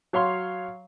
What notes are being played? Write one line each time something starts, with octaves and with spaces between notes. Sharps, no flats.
F#3 C#5 F5 C6